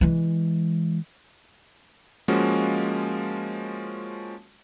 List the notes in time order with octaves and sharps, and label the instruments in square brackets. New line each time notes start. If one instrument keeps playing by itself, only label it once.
[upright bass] E3 G#3
[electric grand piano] F3 G#3 A#3 C#4 F#4